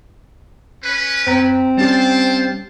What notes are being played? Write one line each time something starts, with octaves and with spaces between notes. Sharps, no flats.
C#4 B4
F#2 C4 A#5
G3 C#4 G4 C5 F5 A5